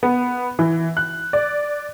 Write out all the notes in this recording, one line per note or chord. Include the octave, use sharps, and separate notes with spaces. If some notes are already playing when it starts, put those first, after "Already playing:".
B3
E3
F#6
D5